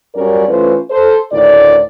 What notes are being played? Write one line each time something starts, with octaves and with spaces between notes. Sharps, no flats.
F#2 G3 C#4 F#4 A#4 D5
E3 A3 C#4 F4 B4 C5
A4 C5
D2 A2 D#3 E4 D5